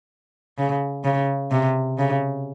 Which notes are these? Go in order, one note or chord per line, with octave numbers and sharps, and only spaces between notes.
C#3
C#3
C3
C#3